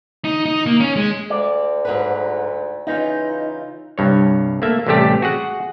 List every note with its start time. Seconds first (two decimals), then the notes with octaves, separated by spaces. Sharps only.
0.24 D#4
0.46 D#4
0.67 A#3
0.80 C#4
0.96 G#3
1.30 D2 D5
1.85 G#2 F#3 B4
2.87 C#3 E3 D#4 F4
3.98 C2 G2 C#5
4.62 A3 A#3 E5
4.86 A1 C3 G3 A3 G4
5.22 F#4 G#4 F#5